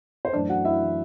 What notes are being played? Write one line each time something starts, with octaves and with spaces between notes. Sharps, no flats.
C5
F#2 E3 A3 D4 D5
F#4 F#5
E4 E5
E3 A3